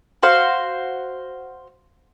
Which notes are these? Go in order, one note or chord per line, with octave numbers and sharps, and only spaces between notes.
F#4 C5 F5